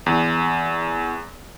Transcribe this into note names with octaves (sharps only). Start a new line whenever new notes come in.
E2